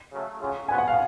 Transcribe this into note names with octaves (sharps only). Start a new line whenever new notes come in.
C#3 F#3 A3
C#3 F#3 C#4 F4 G#4
D3 F3 B3 F#4 G#5
F#5
F5